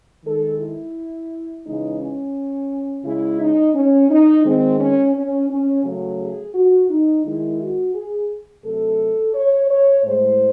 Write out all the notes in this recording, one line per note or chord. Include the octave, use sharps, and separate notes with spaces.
D#3 G#3 A4
E4
C#3 E3 G#3 D#4
C#4
C#3 G#3 E4
D#4
C#4
D#4
D#3 G#3 C4
C#4
C#4
C#4
C#3 F#3 A3
G#4
F#4
D#4
D#3 G#3 E4
F#4
G#4
C3 F#3 A3 A4
C#5
C#5
A2 G#3 C5